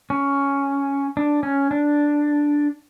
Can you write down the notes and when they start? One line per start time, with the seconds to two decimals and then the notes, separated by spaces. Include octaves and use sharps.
0.10 C#4
1.17 D4
1.43 C#4
1.71 D4